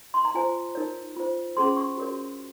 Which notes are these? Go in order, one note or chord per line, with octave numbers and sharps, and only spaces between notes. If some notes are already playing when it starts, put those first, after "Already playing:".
C6
A#5
F4 C5 G#5
D#4 A#4 C#5
F4 C5
C#4 G#4 C5 C6
C#6
F#4 A#4 C#5